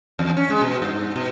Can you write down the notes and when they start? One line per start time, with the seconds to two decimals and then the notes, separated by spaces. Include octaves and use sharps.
0.19 E2
0.37 C#4
0.50 G#3
0.62 B2
0.82 G2
1.16 B2